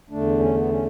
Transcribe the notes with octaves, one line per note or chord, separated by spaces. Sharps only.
E2 D3 A3 D4
C#4
B3
C#4